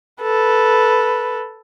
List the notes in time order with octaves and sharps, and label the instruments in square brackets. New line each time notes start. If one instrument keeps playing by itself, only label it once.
[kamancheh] A4 B4